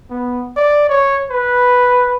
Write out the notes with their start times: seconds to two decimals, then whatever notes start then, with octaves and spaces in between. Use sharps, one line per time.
0.10 B3
0.57 D5
0.89 C#5
1.30 B4